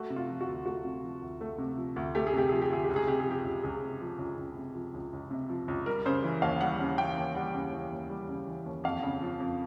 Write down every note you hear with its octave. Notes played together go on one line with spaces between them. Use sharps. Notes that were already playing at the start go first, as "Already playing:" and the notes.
Already playing: A3 F#4
C3
F4
F3
F#4
D2
A3 F#4
C3
F3
D2
A3
C3
F3
D2
A3 G4
G#4
C3 G4
F3 G#4
G4
D2 G#4
G4
C#2
G#4
C3 G4
G#4
F3 G4
C#2
C#2 G#4
C3
F3
C#2
C#2
C3
F3
C#2
C#2
C3
F3
C#2
G3 A#4
C#3 C5
E3
D#2 F5
G3 F#5
C#3
E3 G5
D#2
G3 F#5
C#3
E3
D#2
G3
C#3
E3
D#2
F2 F5
C#3
F3
F2